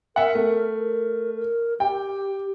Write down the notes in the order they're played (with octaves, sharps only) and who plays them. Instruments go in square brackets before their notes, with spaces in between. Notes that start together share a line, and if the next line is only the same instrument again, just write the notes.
[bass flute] A#4 [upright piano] E5 F#5
[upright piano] A3
[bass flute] A#4
A#4
[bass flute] G4 [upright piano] G5